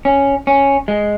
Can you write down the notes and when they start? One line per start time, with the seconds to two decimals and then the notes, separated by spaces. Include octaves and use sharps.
0.05 C#4
0.47 C#4
0.88 G#3